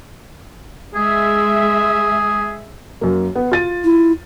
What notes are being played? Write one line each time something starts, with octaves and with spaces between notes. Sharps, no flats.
G#3 G#4 E5
F#2 A#3
B3
F4 A6 D#7
E4